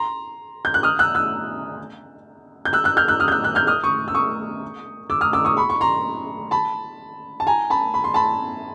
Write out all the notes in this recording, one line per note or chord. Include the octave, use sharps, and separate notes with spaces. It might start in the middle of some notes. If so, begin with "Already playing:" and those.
Already playing: A#5 C6
G6
F#6
D#6 F6
E6 F#6
E6 F#6
G6
E6 F#6
E6 F#6
F6 G6
E6 F#6
D#6 F6
G6
E6 F#6
E6 F#6
F6 G6
D#6 F6
C#6 D#6
E6
C#6 D#6
D6 E6
D#6 F6
D6 E6
C#6 D#6
B5 C#6
C#6
A#5 C6
A5 B5
A5
G#5 A#5
A5 B5
B5
C6
A5 B5